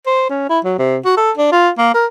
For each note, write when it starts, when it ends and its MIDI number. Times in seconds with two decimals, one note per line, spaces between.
0.07 0.27 72
0.30 0.46 61
0.49 0.59 64
0.65 0.74 54
0.79 0.98 48
1.05 1.15 66
1.17 1.31 69
1.37 1.51 62
1.52 1.69 65
1.78 1.91 58
1.94 2.06 70